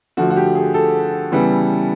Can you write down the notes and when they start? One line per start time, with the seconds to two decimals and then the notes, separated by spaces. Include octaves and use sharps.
0.17 D3 F3 A3 F#4
0.30 F#4
0.36 G4
0.55 G#4
0.74 A4
1.32 C#3 E3 G3 B3